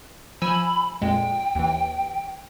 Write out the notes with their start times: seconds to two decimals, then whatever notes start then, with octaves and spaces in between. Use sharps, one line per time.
0.42 F3 G#5 B5 E6
1.02 F2 A#2 G#3 G5
1.55 D#2 E3